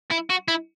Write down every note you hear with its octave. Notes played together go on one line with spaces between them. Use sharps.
E4
F#4
E4